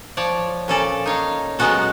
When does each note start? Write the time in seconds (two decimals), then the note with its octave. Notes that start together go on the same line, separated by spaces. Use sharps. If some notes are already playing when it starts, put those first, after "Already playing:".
0.17 F3 C#5 D5
0.68 A#2 C#4 A4 D5
1.06 D#4 C#5 F5
1.59 F#3 G#3 B3 C#4 F#4 A4